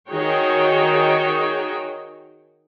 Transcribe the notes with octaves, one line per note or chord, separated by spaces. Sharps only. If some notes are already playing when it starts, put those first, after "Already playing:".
D#3 D#4 F#4 G#4 C#5 G5